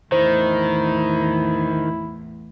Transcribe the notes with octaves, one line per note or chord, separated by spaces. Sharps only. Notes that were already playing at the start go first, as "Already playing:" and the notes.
E2 A2 D#3 E4 C5